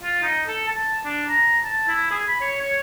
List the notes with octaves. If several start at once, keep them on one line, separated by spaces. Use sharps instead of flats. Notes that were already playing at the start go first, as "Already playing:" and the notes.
F4
D#4
A4
A5
D4
A#5
A5
E4
G#4
B5
C#5
C#5